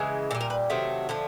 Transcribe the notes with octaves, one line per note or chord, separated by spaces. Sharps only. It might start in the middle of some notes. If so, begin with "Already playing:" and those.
Already playing: C#3 E3 G#3
A#2 G3 A4
A#4
B4
C3 D#3 F#3 A3
D3 F3 A3